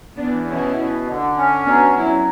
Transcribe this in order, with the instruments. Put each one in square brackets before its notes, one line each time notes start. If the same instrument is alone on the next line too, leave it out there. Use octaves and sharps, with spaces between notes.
[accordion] E2 [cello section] B3 D4
[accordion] B2 [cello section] C#4 E4
[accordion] B2
D3
C#4
[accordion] F#3 [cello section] B3 D4
[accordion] F#3 [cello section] C#4 E4